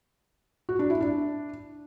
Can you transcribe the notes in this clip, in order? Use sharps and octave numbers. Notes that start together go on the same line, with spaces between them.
F#4
D4
E4
D4